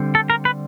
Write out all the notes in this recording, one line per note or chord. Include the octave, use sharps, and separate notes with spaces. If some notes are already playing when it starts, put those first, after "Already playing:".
Already playing: D3 G3 C4
A4
A#4
B4